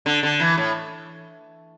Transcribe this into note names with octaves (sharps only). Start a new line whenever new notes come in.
D3
D3
E3
A2